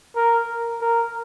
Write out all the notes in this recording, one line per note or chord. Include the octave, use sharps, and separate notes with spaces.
A#4
A#4